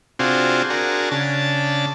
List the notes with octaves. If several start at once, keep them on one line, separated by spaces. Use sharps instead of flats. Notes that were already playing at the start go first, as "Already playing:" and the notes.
C3 C4 D4 F4 F#4 G#4
D4 F#4 G#4 A#4
C#3 D4 A5